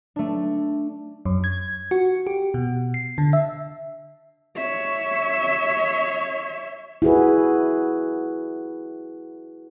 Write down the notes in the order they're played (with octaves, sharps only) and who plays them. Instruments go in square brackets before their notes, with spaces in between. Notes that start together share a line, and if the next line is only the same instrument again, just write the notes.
[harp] A3 D4
[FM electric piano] F#2
G#6
F#4
G4
B2
C7
D3
E5
[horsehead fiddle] C#5 E5
[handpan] E4 F#4 G#4 B4